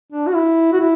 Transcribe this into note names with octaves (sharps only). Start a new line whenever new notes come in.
D4
F#4
E4
F#4
E4